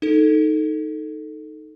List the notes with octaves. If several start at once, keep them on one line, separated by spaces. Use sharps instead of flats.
D#4 A4